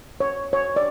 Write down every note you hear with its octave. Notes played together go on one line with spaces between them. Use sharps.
C#5
C#5
D5